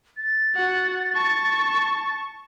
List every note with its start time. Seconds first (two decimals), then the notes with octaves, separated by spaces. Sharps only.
0.17 A6
0.56 F#4 F#5
1.15 A5 C#6